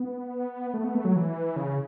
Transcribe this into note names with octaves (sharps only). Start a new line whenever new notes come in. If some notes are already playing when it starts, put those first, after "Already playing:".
Already playing: B3
A3
B3
A3
F#3
E3
C#3